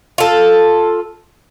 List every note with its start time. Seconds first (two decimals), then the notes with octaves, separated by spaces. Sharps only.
0.18 F4 A4